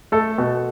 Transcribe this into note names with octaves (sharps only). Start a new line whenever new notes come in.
A3 A4
B2